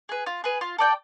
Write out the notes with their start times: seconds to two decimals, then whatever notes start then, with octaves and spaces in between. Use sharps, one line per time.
0.09 G#4 B4
0.26 F4
0.44 G#4 B4
0.61 F4
0.78 A4 D5 G5